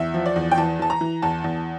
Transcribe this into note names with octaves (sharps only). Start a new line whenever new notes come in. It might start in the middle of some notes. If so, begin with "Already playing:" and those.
Already playing: E2 E5
F3
D5
E2
G5
E3 A5
E3 A5
A#5
E3
E2 A5
E2